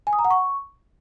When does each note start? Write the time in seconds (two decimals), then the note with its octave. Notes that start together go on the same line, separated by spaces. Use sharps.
0.07 G#5
0.13 D#6
0.19 A#5
0.25 F#5
0.30 C#6